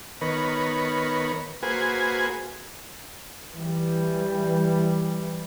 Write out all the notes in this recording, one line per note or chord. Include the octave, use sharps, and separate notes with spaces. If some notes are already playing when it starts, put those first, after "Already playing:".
D#3 B3 A#4 B4 C#5
A#3 F#4 G#4 B4 C5 G#5
E3 G3